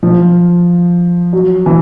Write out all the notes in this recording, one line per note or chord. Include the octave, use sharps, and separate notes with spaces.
F3
F#3
E3